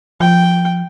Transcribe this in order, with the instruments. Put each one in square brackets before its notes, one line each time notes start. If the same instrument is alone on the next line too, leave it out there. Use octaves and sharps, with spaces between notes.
[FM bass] F3 [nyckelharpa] G5